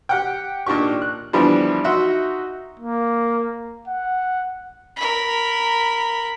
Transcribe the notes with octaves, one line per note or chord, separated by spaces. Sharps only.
G4 F#5 G5
A#2 D4 D#4 G4 C#6
F#6
D3 E3 F3 G3 B3 D4
D#4 F#4 E5 F#5 C6
A#3
F#5
A#4 B5